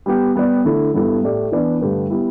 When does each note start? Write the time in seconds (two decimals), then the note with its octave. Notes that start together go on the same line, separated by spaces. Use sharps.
0.06 G3 B3 G4
0.35 G3 B3 G4 D5
0.65 D3 A3 E4
0.94 G2 G3 B3 E4 A4
1.23 A2 A3 G4 D5
1.52 E3 B3 D4 B4 D5
1.81 G2 D3 A3 G4 B4
2.10 G3 B3 E4